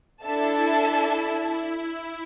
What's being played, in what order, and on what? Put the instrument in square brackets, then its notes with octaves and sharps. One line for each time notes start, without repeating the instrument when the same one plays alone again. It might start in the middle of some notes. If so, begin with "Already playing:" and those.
[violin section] D4 A4 E5 A5 [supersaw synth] E4